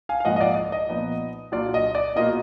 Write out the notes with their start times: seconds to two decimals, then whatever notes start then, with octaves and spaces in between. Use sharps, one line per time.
0.09 F5 G#5
0.20 F5
0.25 G#2 F3 A#3 F4 D#5 F#5
0.36 D#5
0.41 D5 F5
0.56 D5
0.72 D#5
0.89 A#2 F3 B3 D#4
1.52 A#2 F#3 D4 F4 D5
1.74 D#5
1.95 D5
2.16 B2 A#3 F4 D#5